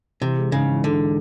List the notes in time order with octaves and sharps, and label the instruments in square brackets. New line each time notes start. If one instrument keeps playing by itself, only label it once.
[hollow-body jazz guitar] C3 [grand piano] E3
[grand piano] G#3
[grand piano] G#2 [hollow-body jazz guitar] C#3
[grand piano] E3
[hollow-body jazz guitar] D3 [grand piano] E3